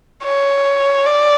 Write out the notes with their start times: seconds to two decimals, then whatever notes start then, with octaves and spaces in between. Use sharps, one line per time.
0.23 C#5
1.06 D5